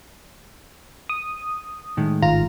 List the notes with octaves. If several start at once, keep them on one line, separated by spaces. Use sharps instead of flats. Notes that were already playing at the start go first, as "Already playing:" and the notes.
D#6
A2 D#3 G#3
G#1 F4 A#5